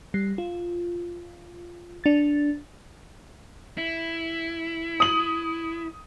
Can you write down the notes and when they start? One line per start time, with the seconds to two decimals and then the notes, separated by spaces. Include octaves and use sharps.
0.14 G3 C7
0.38 F4
2.04 D4 A6
3.78 E4
5.00 D#6 F#7